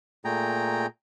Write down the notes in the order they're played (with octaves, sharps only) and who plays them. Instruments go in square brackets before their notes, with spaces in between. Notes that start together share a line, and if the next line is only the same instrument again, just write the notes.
[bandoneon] A#2 A3 G#4 G5 A#5